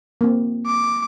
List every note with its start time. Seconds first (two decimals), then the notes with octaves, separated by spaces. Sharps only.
0.21 A#3 C4
0.66 D6